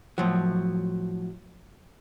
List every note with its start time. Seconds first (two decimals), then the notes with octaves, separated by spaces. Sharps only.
0.18 A2 F3 F#3